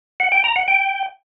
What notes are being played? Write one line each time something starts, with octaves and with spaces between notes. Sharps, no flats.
F#5
G5
A#5
F#5
G5